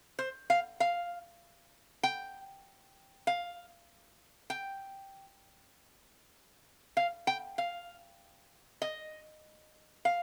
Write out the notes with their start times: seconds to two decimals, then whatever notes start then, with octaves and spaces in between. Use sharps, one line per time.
0.19 C5
0.50 F5
0.80 F5
2.03 G5
3.27 F5
4.50 G5
6.97 F5
7.27 G5
7.58 F5
8.82 D#5
10.05 F5